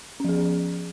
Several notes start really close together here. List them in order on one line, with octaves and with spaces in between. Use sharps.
C#4 F3 G#4